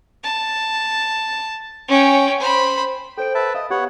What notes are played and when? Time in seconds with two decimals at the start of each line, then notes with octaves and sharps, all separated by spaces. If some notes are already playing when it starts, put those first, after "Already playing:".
0.23 A5
1.88 C#4 G5
2.39 C5 B5
3.17 A4 C5 G5 D7
3.35 B4 E5 A5
3.54 D#5 F5
3.70 B3 G4 C#5 F#5